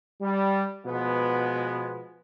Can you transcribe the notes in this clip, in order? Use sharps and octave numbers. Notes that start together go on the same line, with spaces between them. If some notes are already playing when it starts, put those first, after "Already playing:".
G3
B2 F3 G#3 B3